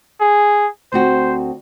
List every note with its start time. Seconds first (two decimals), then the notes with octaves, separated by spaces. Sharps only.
0.21 G#4
0.92 D2 C4 F#4 C5